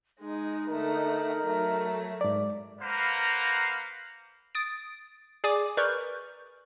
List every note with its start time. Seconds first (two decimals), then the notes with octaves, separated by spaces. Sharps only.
0.20 G#3 D#4
0.69 D3 A3 A#4 F#5
1.43 F#3 A3
2.21 G#2 D5
2.82 A#3 B4 C5 F5 F#5 A#5
4.55 D#6 A6 D7
5.44 G#4 D5 G#5 D6 D#6
5.77 A#4 B4 D5 C#6 F6 G6